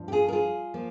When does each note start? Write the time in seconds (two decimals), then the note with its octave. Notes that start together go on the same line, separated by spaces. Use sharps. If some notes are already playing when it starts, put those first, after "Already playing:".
Already playing: G2 F3
0.08 G4
0.12 F4 G#4
0.28 A#4
0.32 F4 G#4
0.74 F3 A#3